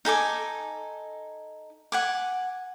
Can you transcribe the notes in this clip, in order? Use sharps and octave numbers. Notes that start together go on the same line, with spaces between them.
D#4 A4 G#5 D6
F#5 G#5 D6